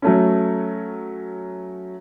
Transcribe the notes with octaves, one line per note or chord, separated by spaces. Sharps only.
F#3 A3 C#4